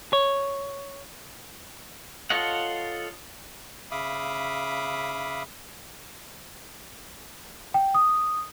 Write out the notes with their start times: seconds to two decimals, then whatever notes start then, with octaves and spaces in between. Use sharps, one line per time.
0.13 C#5
2.30 F4 A4 C#5 D#5 F#5
3.91 C#3 E5 F5 B5 D6 D#6
7.74 G5
7.95 D#6